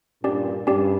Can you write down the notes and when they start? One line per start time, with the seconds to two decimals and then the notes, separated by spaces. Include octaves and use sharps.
0.24 G2 A#2 C#4 G4 D5
0.67 G2 C#4 G4 D5